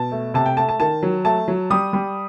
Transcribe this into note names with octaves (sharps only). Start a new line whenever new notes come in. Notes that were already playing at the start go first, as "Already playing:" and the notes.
Already playing: B2 A5
A3
C3 A5
G5
A3 A5
A5
D#3 A5
F#3
A3 A5
F#3
G3 D#6
G3